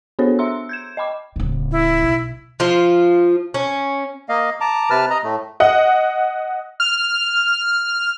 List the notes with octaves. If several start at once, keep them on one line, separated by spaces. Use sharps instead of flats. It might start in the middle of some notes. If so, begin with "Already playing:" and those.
B3 D4 F#4 A4 C5 C#5
E5 A#5 C6 E6
G6 G#6 E7
D#5 G5 B5 D6
D1 C#3
E4
B1
F3 F4
C#4
A#3 D#5 F5
A5 A#5 D6
C3 B4 A5 F6
D#5 A#5
A2 A3
D#5 F#5
F6